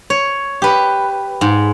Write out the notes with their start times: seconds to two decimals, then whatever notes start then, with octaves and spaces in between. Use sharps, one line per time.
0.10 C#5
0.62 G4 B4
1.41 G#2